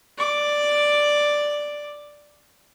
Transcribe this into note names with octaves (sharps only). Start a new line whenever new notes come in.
D5 D6